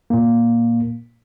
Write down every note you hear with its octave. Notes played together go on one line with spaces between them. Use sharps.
A#2 A#3